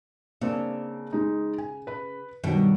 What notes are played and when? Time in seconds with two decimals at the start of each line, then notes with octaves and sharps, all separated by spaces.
0.41 C#3 A#3 C4 D4
1.13 G#3 D#4
1.58 G#5
1.87 B4 B5
2.44 G2 B2 D#3 F#3